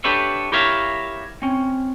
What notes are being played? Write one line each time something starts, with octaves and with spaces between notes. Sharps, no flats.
D4 G4 A4 B4 C#5 E5
E4 G4 A#4 C#5 E5 F5
C4 C#4